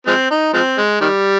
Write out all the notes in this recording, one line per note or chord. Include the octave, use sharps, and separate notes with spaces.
F3 G#3 C4
D#4
F3 G#3 C4
G#3
D#3 G3